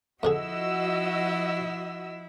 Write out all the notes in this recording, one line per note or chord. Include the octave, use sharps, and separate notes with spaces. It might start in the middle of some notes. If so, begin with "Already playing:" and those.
F2 D3 F3 E4 F#4 G#4 D#5 E6